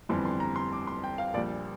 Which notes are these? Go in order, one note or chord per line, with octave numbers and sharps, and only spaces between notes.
G1 F2 E3 G3 C6
C6
A#5
C6
D6
C6
G5
F5
A#1 A#2 G3 D5